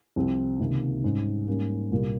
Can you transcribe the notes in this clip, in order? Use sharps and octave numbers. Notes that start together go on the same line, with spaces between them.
C2 C3 F3 C4
C#2 C3 D#3 A#3
G#2 G3 C#4
G#2 G3 A#3 C#4
C2 A#2 G3 A#3